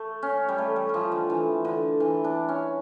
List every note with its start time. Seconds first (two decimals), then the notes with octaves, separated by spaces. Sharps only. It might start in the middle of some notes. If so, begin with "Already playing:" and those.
Already playing: A3
0.22 C#4
0.49 G3
0.58 A3
0.76 G3
0.89 F3 G3
1.12 D3
1.30 E3
1.65 D3
2.00 E3
2.24 D4
2.49 C#4